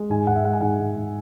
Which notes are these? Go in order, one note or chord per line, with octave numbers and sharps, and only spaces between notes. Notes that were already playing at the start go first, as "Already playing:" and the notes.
Already playing: G#3
G#2 G#5
G#2 F#5
E5
G#3 F#5
G#5
G#2 F#5
G#2
G#2